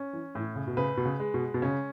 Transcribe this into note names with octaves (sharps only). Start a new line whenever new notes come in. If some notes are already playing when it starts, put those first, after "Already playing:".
Already playing: C#4
E3
A2 E3
C#3
B2
C#3 B4
B2
C#3
G#3
B2
B2
C#3 C#4